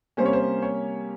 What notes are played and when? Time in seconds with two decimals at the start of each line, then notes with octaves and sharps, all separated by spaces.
0.17 C3 G3 A#3 C#4 C5
0.26 C#5
0.33 C5
0.62 C#5